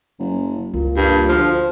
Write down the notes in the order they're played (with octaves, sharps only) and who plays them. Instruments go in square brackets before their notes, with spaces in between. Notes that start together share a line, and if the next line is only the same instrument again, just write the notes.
[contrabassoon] F#1
[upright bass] C#2 [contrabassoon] A#2
[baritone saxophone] G2 [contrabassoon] A#2
[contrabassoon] D2 [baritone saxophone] F3